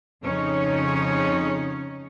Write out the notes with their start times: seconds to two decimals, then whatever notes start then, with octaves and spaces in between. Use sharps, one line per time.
0.24 F2 C#3 C#4 D#4 C#5